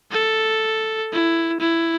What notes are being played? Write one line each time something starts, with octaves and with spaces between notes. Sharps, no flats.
A4
E4
E4